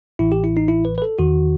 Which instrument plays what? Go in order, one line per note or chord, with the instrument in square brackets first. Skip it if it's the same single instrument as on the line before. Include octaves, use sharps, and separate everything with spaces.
[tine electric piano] A1 A2 E3 E4
G4
E4
D#4
E4
B4
B4
A4
E2 D#3 F#4